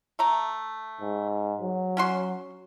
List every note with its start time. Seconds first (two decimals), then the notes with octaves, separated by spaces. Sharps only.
0.19 A3 A#5
1.02 G#2
1.61 F#3
1.97 C#4 F#4 C6